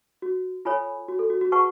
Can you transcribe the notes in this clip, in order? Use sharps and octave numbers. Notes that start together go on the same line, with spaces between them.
F#4
F4 A4 C#5 G#5 B5
F#4
A4
F#4
F#4
G#4 B4 F#5 A5 C#6